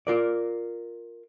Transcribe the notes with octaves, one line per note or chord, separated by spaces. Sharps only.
F4 A#4 D5